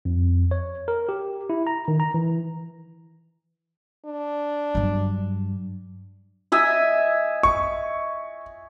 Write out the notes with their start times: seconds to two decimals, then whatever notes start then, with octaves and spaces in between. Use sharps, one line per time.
0.05 F2
0.51 C#5
0.88 A#4
1.09 G4
1.50 E4
1.67 A#5
1.88 D#3
2.00 A#5
2.14 E3
4.05 D4
4.75 G2 F#3
6.52 D#5 E5 G#5
7.43 C#6